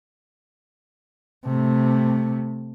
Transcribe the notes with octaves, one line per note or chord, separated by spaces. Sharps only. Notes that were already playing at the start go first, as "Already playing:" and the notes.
C3 A3